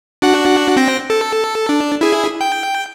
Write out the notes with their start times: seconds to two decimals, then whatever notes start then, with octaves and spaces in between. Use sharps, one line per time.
0.22 D4 F#4 F#5
0.77 C4 G5 A#6
1.10 A4
1.69 D4
2.01 E4 G#4
2.41 G5